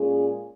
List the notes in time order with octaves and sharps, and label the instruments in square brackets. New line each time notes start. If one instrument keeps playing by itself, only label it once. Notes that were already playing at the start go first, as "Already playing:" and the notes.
Already playing: [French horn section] A#2 G#3 C#4 F4 G#4